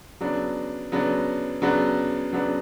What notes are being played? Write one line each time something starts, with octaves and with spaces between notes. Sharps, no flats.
C#3 F#3 B3 D4
C#3 F#3 B3 D4
C#3 F#3 B3 D4
C#3 F#3 B3 D4